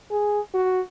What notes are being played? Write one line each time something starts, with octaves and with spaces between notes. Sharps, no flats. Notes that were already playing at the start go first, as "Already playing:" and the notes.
G#4
F#4